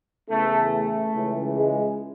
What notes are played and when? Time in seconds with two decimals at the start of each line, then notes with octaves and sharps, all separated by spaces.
0.28 E2 C#3 E3 A3
0.71 A3
1.13 C#2 C#3 E3
1.56 G#3